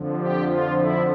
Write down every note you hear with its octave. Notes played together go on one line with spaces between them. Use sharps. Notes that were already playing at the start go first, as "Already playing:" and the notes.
Already playing: F2 D3 F3
G4
F4
E4